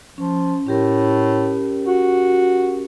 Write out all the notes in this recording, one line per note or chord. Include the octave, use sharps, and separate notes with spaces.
F3 C#4
A2 C#4 G4 A#4
F#4